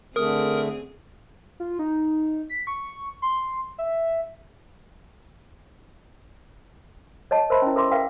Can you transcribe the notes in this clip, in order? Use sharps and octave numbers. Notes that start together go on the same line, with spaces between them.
D3 A3 C4 G#4 A#4 D#6
F4
D#4
B6
C#6
C6
E5
C#5 D#5 A5
A#4 C5 E5 B5 C6
C#4 E4
A4 A#4 E5 C6 D6
A#4 B4 E5 F5 G5